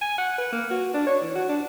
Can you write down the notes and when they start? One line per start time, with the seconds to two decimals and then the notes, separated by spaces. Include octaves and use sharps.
0.01 G#5
0.18 F#5
0.38 B4
0.53 A#3
0.71 F#4
0.94 D4
1.07 C#5
1.22 E3
1.35 F#4
1.49 D4